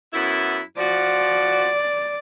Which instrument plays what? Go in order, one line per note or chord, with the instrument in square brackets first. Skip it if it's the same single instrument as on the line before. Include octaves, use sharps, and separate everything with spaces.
[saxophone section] F#2 B3 E4
[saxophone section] F3 F#4 [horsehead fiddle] D5